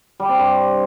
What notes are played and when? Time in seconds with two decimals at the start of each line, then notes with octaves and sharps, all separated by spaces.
0.20 G3
0.29 C4
0.38 G2